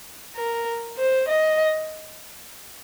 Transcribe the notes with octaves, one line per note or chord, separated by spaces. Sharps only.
A#4
C5
D#5